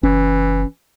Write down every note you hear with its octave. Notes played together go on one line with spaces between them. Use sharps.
F#1 E3 C#4